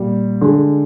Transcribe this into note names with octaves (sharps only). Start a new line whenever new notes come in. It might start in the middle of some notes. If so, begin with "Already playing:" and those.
Already playing: A#2 G3
D3 G#3